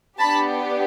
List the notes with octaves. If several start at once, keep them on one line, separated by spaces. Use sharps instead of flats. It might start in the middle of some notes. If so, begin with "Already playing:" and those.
B3 D4 G4 A5 B5